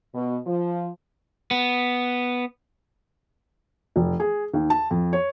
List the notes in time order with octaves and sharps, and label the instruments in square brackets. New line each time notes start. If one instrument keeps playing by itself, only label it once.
[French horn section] B2
F3
[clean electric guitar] B3
[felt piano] F1
G#4
D#2
A5
F2
C#5